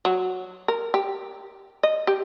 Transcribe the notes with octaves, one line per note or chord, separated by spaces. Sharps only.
F#3
A#4
G4
D#5
G4